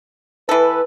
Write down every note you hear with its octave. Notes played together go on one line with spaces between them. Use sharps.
E3 A4 B4